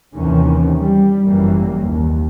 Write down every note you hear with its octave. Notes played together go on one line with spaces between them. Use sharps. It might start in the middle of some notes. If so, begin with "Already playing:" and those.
D#2 C3 D#3 E3 C#4
G3
G1 F#2 E3 G3 A#3
D#2